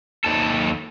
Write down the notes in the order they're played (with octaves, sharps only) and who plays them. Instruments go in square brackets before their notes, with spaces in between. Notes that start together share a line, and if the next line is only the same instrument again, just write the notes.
[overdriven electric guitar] D#2 A4